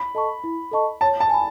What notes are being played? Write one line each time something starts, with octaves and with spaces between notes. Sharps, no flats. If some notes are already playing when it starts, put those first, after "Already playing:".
Already playing: B5
A4 D#5 A5 C#6
E4
A4 D#5 A5 C#6
C#5 A5
A5
G#5 B5